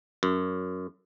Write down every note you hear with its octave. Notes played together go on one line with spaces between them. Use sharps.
F#2